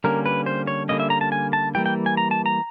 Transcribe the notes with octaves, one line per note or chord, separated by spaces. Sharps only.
D3 G3 A#3 C#4 A#4
B4
C5
C#5
D3 G3 A#3 C#4 D#5
E5
A#5
A5
G#5
A5
E3 G3 A#3 G5
G5
G#5
A#5
A5
A#5